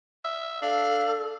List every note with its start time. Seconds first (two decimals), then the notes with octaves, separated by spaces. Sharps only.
0.24 E5
0.62 D4 A4 F5